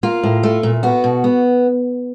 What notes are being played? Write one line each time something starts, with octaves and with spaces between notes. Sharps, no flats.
A#3 F4
A2
A3
A#2
B3 F#4
B2
B3